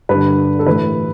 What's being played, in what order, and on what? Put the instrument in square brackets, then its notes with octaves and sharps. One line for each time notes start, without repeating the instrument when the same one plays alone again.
[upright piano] G2 D3 B4
A4
A2 E3 B4